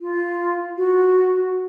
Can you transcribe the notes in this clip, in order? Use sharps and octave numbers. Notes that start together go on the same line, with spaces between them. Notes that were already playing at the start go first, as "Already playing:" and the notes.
F4
F#4